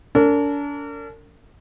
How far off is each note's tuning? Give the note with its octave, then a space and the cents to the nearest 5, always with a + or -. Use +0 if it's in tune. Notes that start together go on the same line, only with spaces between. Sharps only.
D4 -40 A#4 -40